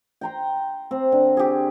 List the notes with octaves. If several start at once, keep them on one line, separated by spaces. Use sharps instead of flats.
G5 A#5 C6
C4
D3
G4 G#4